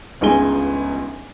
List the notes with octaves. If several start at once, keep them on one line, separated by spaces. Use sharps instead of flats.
G1 C#2 D#4 G#4 G#5 G7